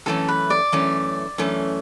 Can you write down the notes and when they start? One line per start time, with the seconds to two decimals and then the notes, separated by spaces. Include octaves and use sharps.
0.06 F#2 E3 A3 C#4 A4
0.28 B4
0.50 D5
0.72 F#2 E3 A3 C#4
1.38 F#2 E3 A3 C#4